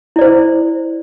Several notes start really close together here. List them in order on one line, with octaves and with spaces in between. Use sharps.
E4 D5 C5